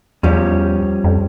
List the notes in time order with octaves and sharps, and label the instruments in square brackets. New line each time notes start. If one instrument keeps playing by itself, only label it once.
[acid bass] E2 [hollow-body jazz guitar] F3 G3 C#4
[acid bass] F2